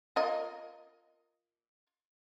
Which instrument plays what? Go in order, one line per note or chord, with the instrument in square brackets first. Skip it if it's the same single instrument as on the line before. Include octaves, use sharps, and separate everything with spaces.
[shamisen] F4 A#4 D#5